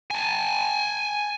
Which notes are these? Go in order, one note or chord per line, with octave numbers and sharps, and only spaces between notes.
G#5 A5